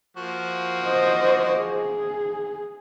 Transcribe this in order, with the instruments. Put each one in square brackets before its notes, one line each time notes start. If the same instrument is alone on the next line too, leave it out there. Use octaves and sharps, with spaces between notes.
[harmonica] F3 A#3 F#4
[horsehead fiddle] C5 D#5
G#4